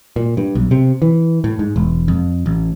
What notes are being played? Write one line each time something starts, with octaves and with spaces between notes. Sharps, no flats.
A#2
G2
B1
C3
E3
A2
G#2
E1
F2
A1